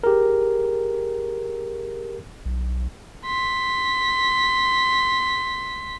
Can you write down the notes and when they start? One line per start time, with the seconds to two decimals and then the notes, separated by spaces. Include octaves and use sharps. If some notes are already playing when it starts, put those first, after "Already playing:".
0.04 G4 G#4 A#4
2.46 B1
3.25 C6 B6